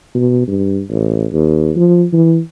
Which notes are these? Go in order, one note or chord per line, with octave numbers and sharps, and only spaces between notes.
B2
G2
A1
D#2
F3
E3